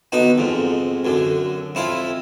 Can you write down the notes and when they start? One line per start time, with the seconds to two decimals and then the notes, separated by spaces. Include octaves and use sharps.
0.12 D3 B3 D#4 F#4
0.38 F2 G#2
1.05 F#2 D3
1.75 F2 E4 F4